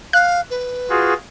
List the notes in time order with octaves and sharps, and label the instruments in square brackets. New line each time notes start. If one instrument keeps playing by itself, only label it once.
[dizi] F5 [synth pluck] F#6
[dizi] B4
[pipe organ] F4 F#4 G#4